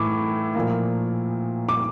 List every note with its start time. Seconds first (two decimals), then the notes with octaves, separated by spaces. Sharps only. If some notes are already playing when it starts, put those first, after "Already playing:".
Already playing: A2 E3 A3 D6
0.55 A#2 F3 A#3
1.69 D6